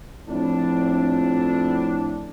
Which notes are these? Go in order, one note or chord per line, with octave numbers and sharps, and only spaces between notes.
F2 A2 D4